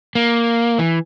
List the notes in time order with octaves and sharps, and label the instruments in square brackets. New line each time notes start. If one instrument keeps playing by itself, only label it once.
[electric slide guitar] A#3
E3